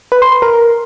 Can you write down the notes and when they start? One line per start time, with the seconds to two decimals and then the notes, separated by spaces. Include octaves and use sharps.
0.12 B4
0.22 C6
0.32 C6
0.42 A#4